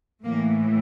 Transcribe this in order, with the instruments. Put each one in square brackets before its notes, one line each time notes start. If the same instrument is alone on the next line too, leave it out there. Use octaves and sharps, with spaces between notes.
[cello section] A2 E3 A#3